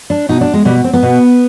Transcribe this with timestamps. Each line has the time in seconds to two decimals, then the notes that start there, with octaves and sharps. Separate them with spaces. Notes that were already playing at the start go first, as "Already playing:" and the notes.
0.10 D4
0.29 B2 D#4
0.41 D4
0.53 G#3
0.65 B2 G3
0.84 C4
0.93 B3
1.03 B2